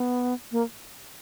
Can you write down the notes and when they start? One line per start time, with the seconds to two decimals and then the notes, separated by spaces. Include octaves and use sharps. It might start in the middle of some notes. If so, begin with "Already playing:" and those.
Already playing: B3
0.52 A#3